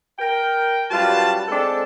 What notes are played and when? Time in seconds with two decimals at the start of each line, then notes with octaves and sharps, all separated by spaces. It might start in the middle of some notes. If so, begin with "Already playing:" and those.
0.19 A#4 G5
0.91 F#2 G3 F4 F#4 B4 A5
1.48 G#3 C4 D4 A4